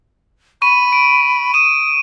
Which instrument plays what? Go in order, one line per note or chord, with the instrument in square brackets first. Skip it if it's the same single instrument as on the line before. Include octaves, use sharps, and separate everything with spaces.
[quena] B5 [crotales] C#6 D#7
[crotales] D7
[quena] D#6 [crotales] D#7 E7